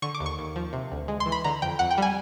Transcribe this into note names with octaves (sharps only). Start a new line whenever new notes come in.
D3 C#6
D6
D#2
C#6
D#2
F3
C3
D2
G#3
C6
E3
B5
D3 A#5
F2 G5
F2 F#5
G5
G3 G#5